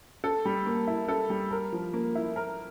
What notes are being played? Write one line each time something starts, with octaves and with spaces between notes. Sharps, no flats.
A4
G3
A#3
E4
A4
G3
A#4
F3
A#3
E4
A#4